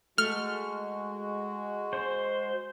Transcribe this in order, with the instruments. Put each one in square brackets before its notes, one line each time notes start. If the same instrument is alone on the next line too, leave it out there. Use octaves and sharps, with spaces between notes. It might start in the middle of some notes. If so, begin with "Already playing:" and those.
[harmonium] G#3 F#4 [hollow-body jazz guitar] A3 [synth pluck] F6
[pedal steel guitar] C5